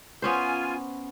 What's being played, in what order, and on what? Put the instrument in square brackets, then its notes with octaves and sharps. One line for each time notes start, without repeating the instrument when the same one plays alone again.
[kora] B3 C#4 C5 [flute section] F4 G#5